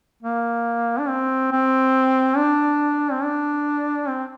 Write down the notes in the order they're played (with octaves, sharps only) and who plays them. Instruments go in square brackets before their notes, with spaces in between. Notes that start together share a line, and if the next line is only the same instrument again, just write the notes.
[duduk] A#3
D4
C4
C4
D4
C4
D4
C4